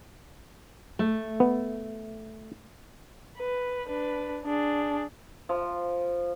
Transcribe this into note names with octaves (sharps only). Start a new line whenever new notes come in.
A3
B3
B4
D4 B4
D4 G#4
F3